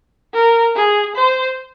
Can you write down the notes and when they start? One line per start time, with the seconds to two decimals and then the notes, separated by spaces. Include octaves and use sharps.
0.34 A#4
0.75 G#4
1.16 C5